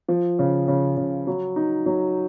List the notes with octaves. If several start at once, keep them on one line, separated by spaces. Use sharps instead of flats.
F3
C#3
C#3
C#3
F#3
D#4
F#3